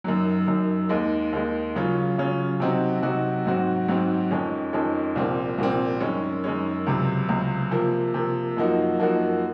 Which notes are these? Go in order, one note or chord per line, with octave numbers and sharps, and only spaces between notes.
F#2 D#3 F#3
F#2 D#3 F#3
D#2 D#3 G#3
D#2 D#3 G#3
C#3 F#3 C#4 F4
C#3 F#3 C#4 F4
C3 F#3 C4 D#4 F#4
C3 F#3 C4 D#4 F#4
G#2 F#3 C4 F#4
G#2 F#3 C4 F#4
F2 D#3 G#3 C#4
F2 D#3 G#3 C#4
C2 A#2 F3 C4
C2 A#2 F3 C4
F#2 D#3 G#3 C#4
F#2 D#3 G#3 C#4
C#2 C3 F#3
C#2 C3 F#3
C3 F3 A#3
C3 F3 A#3
F#2 F3 A#3 D#4 F#4
F#2 F3 A#3 D#4 F#4